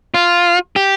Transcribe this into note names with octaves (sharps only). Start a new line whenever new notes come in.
F4
G4